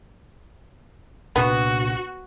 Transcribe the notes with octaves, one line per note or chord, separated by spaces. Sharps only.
C2 A#2 B3 D4 F#4